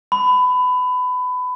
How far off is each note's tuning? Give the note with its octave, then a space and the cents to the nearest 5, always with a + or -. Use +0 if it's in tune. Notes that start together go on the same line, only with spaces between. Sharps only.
B5 +25